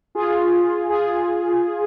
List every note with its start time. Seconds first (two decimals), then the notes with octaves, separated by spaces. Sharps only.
0.15 F4 G#4
0.89 F4 G#4